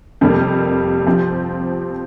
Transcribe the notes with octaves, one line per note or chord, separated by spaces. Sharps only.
F2 C3 G3 A#3
F3 C4 G4